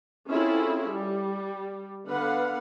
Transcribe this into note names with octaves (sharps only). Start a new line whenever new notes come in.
C4 C#4 E4 F4 G#4 A4
G3
D3 B3 B4 F5 F#5